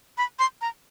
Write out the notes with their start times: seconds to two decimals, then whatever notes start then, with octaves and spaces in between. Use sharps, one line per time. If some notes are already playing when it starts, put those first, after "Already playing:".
0.18 B5
0.39 C6
0.61 A#5